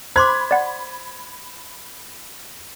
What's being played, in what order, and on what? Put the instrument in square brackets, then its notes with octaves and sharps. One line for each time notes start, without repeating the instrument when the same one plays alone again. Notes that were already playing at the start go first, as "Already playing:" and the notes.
[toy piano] C5 C6 D6 [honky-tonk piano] B5 G#6
[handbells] D5 F#5